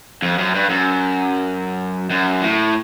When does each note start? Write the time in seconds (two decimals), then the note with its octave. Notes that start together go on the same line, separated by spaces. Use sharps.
0.22 F2
0.38 F#2
0.55 G2
0.70 F#2
2.10 F#2
2.42 A2